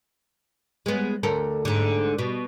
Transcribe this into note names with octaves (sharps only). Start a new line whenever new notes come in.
G#3 B3
D2 A4 A#4
G#2 D3
B2